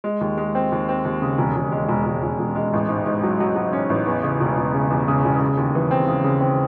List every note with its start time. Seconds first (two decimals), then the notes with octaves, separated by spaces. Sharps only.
0.04 G#3
0.21 D#2
0.38 G#3
0.55 C4
0.72 D#2
0.89 C4
1.05 D#2
1.22 C#3
1.38 E1
1.56 E1
1.72 G#3
1.89 E1
2.06 E1
2.23 E1
2.39 E1
2.56 G#3
2.73 A1
2.89 G#2
3.06 G#2
3.23 F#3
3.40 F#3
3.56 F#3
3.73 C#4
3.90 A1
4.07 E2
4.23 C#3
4.41 E1
4.58 E1
4.74 C#3
4.90 E2
5.08 C#3
5.24 E1
5.41 C#3
5.57 D#2
5.75 E3
5.91 C4
6.08 C#3
6.24 C#3
6.41 C4